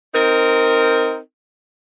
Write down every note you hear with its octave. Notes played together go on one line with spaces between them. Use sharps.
C4 D#4 A#4